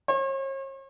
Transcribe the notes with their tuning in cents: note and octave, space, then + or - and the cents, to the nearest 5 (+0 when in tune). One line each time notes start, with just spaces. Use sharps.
C#5 -45